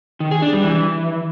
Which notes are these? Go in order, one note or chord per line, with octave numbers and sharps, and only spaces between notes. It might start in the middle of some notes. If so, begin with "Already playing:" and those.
D#3
G#4
D4
G3
E3